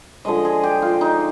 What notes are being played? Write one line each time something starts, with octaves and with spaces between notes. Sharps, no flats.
D3 F3 G#3 D#5
G#4
G4
F4
D#4